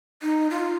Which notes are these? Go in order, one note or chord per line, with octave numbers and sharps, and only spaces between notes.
D#4
F4